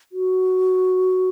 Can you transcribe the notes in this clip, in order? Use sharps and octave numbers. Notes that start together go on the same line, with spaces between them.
F#4